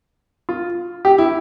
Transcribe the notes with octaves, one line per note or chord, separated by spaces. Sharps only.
F4
G4
E4